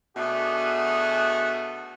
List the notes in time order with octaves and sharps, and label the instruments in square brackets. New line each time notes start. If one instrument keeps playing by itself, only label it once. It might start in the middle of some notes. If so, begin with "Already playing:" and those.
[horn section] B2 A3 D4 F#4 G#4